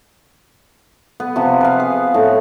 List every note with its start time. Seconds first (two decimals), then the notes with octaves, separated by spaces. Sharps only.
1.20 B3
1.36 C3 F3 B3
1.61 B4 F5
1.80 G#4
2.14 A2